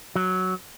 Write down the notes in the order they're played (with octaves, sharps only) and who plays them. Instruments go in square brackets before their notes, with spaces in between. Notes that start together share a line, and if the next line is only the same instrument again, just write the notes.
[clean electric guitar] F#3